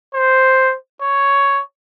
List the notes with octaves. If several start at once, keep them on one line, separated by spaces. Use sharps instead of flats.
C5
C#5